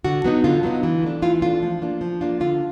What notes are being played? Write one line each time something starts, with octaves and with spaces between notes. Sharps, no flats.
D3 F#4
F#3 B3 D#4
D3 F4
F#3 B3 D#4
E3
A3 D4
E3 F4
A3 D4 F4
F3
A#3 D4 F4
F3
A#3 D4 F4
D3 F4